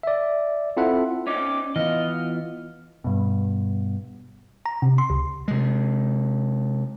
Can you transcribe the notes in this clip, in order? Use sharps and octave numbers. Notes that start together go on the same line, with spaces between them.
D5 E5
C4 E4 F4 A4 E5 F#5
C#4 D#4 D6
E3 B3 F4 D#5 F6
G2 B2
A#5
C3
C6
C#2
C3 G#3